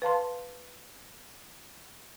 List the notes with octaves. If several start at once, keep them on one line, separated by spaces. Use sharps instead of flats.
B4 F5 A5 C6